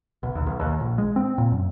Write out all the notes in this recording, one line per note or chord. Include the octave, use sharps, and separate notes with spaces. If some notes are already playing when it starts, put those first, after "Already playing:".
B1
D#2
B1
D#2
A#1
G#3
C4
A#2
F#2